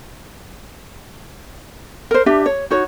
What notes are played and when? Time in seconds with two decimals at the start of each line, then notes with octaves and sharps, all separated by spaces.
2.11 A#4 C5
2.26 D4 G4 E5
2.46 C#5
2.70 D#4 F#4 C#5